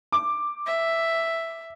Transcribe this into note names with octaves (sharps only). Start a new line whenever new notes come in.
D6
E5